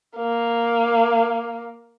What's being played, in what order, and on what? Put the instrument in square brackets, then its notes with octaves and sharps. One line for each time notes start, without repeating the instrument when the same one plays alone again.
[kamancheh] A#3